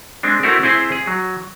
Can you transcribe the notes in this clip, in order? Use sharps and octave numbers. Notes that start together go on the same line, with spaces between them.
G#3 C4 D4
A3 C4 E4 F#4 A#4
C4 E4 G#4 C5
G#4
F#3